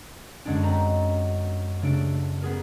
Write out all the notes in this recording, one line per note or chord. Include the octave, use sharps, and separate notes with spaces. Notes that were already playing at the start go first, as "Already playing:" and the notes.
F#2 D3 G#3 C#4 D4
B3 C4 B4 D#5 A#5
C#3 A3 D4 A4 D7
B3 G#4 A#4